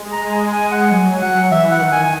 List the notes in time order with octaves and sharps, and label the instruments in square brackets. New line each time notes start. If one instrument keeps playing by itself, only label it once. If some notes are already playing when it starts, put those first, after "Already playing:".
Already playing: [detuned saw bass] G#3
[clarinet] A#5
G#5
G#5
F#5
[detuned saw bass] F#3 [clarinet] G#5
[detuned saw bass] F#3 [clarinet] F#5
[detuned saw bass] E3 [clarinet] E5
[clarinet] F#5
[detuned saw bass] D#3
[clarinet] G#5
G#5